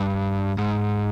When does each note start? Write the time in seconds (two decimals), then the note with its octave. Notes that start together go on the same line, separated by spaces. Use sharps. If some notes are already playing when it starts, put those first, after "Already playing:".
Already playing: G2
0.58 G#2